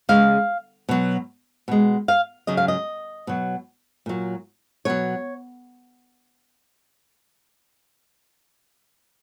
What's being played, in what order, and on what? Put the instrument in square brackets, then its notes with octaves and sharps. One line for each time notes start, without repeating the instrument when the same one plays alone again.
[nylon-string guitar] C#3 G#3 F5
B2 F#3
B2 G#3
F5
C#3 F#3 D#5
F5
D#5
B2 F#3
A#2 F#3
B2 F#3 C#5